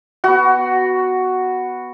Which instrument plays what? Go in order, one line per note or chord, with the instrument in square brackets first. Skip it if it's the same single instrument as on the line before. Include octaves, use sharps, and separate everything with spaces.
[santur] B3 F#4